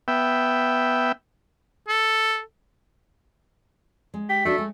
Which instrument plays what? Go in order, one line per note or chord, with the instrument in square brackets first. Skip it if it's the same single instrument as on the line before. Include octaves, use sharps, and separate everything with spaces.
[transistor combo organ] B3 E5 G5
[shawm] A4
[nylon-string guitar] G#3
[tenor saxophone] G4 [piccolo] B6
[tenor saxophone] A3 [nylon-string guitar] D4 D#4 F#4
[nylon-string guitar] G#3